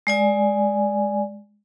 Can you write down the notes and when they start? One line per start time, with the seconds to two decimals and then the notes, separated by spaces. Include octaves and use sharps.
0.07 G#3 D5 G#5